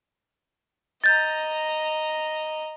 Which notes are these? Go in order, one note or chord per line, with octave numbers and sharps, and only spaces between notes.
D#5 A#5 G6 A6